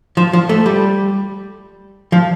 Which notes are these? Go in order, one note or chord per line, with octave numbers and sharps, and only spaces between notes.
F3
F3
A3
G3
F3